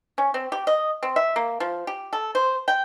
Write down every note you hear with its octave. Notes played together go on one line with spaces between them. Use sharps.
C#4
C4
G4
D#5
C4
E5
A#3
F3
G4
A4
C5
G5